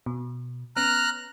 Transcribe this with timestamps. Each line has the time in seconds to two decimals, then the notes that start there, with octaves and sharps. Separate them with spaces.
0.06 B2
0.76 B3 C#4 A#5 F6 F#6